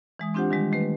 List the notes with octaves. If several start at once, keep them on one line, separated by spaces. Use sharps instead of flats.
E3 G#3 D#6
C4 D4 F4 G4 C5 F#5
D#3 G3 G#3
D#3 A3 B4